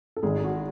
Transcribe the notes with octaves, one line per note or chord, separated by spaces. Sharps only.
A4
G#1 G#2 D#3 G#4
G#4
F#4